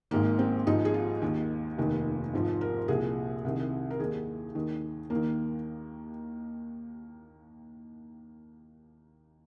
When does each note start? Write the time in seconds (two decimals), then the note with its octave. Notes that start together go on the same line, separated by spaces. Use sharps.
0.11 G#1 G#2 D#3 A#3
0.39 C4
0.67 G#1 G#2 F3 D#4
0.85 G#4
0.94 F4
1.22 D#2 D#3
1.78 F1 D#2 D#3
2.33 G#1 G#2 F3
2.61 A#4
2.88 C2 A#2 F3 G#4
3.45 C2 C3 D#3
3.90 A#4
4.00 D#2 D#3 G#4
4.55 D#2 D#3
5.10 D#2 A#3
5.15 D#3